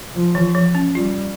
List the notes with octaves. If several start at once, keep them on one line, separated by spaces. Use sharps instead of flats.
F3
E3
F3
C#4
G3 F4